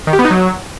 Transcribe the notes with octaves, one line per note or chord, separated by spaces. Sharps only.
D#3
G4
B3
D#4
F#3